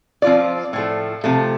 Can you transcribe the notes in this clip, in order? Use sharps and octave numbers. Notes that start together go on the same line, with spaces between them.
F3 C4 F4 D5
A2 F3 A3
C3 F3 A3